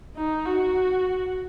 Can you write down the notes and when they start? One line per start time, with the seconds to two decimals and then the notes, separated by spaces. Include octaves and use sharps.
0.16 D#4
0.45 F#4